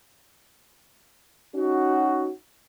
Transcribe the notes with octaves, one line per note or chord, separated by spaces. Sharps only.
C#4 D#4 F#4